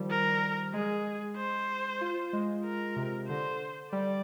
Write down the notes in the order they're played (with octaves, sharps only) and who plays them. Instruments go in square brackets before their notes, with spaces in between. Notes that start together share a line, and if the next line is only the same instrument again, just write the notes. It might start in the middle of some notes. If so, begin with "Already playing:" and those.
Already playing: [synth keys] D#3 F3 G3
[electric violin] A#4
[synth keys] G#3 [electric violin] G#4
[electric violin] C5
[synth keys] F4
G#3
[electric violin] A#4
[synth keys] C3
[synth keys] D3 [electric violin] C5
[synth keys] G3 [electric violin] D5